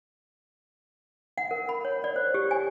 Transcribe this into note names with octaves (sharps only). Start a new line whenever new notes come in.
F#5
A#4
B5
C#5
D5
C5
G4
G#5